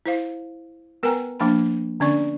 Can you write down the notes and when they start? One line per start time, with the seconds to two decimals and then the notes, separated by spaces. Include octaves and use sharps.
0.06 E4 C5 F5
1.03 B3 A#4 B4 G5 G#5 A#5
1.40 F3 A#3 D4 G5 B5
2.00 D3 B3 C#4 D4 D5 C#6